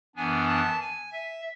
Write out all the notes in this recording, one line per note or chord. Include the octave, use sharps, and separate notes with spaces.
F#2 E3 B3 D4 G#5
A5
G#5
E5